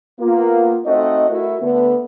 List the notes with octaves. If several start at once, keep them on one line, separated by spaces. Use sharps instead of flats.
A#3 B3 F4
A3 C4 D#4 F#4 D#5
A3 E4 F#4 A#4
D3 A3 B3